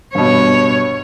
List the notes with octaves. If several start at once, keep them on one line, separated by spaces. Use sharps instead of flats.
G2 B2 C#5